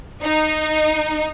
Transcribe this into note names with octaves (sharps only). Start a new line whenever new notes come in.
D#4